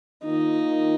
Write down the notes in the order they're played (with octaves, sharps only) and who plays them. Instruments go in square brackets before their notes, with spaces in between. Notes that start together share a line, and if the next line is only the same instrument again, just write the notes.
[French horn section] D#3 A#3 F4 [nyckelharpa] D#4